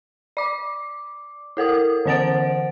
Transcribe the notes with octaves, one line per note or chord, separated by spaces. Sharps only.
D5 D6
E4 A4 A#4 D#6
D3 E3 C5 F#5 A6 D7